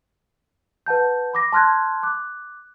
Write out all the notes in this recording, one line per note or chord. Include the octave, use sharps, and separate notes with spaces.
B4 F#5 A5 G6
B5 D6 A#6
A5 C6 F6 F#6 G#6
D6 F#6